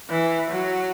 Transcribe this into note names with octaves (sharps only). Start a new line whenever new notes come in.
E3
F#3